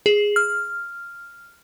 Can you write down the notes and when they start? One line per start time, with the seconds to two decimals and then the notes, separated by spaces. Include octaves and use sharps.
0.06 G#4
0.36 F6